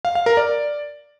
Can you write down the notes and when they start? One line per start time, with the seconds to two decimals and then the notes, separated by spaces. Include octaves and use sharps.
0.05 F5
0.15 F5
0.26 A#4
0.37 D5